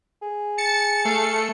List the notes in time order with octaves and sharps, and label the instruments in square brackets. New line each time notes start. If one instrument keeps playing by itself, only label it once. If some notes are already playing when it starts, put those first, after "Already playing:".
[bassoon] G#4
[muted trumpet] A5 [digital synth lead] C#7
[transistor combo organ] A3 [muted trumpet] F5